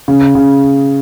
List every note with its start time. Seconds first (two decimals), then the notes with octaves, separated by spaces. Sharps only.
0.08 C#3
0.35 C#3